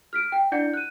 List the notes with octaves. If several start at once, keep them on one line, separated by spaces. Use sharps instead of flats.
F6 B6 D7
G5
D4 E4 D5 F#5 G6 C#7
F#6 D#7